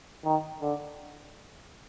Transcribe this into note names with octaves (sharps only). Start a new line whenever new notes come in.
D#3
D3